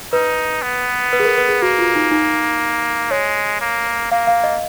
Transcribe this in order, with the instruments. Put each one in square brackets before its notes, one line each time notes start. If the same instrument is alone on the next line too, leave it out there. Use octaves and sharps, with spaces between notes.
[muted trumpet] D#4 [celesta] B4
[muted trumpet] B3
[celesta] B4
G#4
A#4
B4
G#4
[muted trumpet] A#3 [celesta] F#4
[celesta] F4
D#4
D#4
[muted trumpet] G#3 [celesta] C#5
[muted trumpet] A#3
[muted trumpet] A#3 [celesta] F5
[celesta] F5
D#5